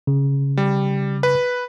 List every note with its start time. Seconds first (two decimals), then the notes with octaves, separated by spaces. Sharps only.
0.07 C#3
0.57 G3
1.23 B4